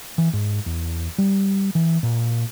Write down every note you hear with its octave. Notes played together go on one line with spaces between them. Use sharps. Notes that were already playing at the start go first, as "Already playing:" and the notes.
E3
G#2
E2
G3
E3
A#2